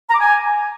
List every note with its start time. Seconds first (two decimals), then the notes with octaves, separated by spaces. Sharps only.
0.10 A#5
0.15 D6
0.20 G#5